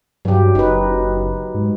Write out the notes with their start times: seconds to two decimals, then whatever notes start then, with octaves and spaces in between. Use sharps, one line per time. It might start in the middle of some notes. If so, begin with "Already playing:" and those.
0.25 G2 F#3 G4
0.55 F#1 D#4 B4
1.55 G#2